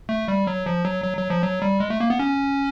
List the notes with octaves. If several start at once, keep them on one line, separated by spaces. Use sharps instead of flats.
A3
G3
F#3
F3
F#3
F#3
F#3
F3
F#3
G3
G#3
A3
A#3
B3
C#4